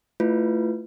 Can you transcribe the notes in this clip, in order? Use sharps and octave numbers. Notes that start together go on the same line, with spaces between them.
A3 E4 F4 B4